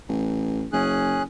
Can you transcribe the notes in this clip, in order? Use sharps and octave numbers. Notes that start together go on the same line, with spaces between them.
A1
F#1 C#4 G#4 F#6